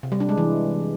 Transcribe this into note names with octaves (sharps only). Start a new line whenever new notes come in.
C3
G3
D4
G#3
E3